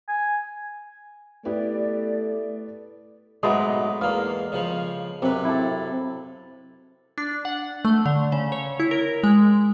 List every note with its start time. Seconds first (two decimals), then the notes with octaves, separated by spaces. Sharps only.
0.08 G#5
1.45 A3 B3 E4 G4 D5
3.43 G#2 F#3 G#3 A3 B3 D#5 D6
4.01 E2 A#3 F5
4.52 C#3 F3
5.22 F#2 C3 B4
5.45 E4 A4
7.18 D4
7.45 F#5
7.85 A3
8.06 D3
8.32 C#3
8.52 C#5
8.80 E4
8.91 A#4
9.24 G#3